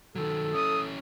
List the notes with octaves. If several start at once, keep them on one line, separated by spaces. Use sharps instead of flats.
D#3 F#3 A4
C#4 E4 D#6